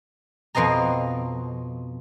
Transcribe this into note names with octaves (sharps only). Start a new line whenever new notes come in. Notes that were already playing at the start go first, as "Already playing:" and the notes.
F2 B2 C4 D#5 A#5